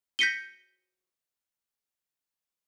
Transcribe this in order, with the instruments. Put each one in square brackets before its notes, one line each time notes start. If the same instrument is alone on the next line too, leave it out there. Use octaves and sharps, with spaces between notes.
[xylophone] G6 A#6 B6 C#7 D#7 G7